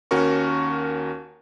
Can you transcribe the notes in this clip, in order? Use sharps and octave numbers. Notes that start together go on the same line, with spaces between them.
D#2 C#4 F#4 A#4 C#6